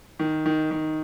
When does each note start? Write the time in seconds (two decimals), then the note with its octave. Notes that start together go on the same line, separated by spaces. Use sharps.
0.19 D#3
0.46 D#3
0.71 D#3